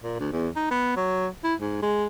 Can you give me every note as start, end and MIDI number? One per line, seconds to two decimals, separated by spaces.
0.02 0.17 46
0.20 0.29 38
0.32 0.49 40
0.56 0.68 63
0.71 0.94 59
0.97 1.28 54
1.44 1.54 64
1.60 1.81 44
1.82 2.07 56